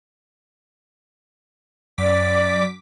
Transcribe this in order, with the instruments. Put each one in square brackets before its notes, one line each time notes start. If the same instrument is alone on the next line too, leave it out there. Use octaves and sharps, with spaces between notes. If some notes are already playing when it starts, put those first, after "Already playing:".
[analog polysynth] F#2 D6 B6 [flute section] D5